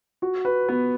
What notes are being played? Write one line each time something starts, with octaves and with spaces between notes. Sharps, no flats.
F#4
B4
B3